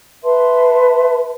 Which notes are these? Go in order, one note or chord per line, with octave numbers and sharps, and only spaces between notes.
B4 E5 A5 C6